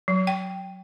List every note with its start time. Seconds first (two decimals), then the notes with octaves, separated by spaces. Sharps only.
0.08 F#3
0.27 G5